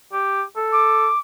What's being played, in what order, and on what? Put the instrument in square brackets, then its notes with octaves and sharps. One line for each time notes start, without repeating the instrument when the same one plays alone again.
[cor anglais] G4
A4
[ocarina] D6